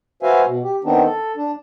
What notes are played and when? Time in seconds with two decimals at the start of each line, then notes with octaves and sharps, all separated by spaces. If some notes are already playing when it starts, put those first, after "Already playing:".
0.23 F#4 B4 C5 E5 F5 G#5
0.46 B2
0.63 G4
0.84 D#3 B3 C4 D4 D#4
1.04 A4
1.36 D4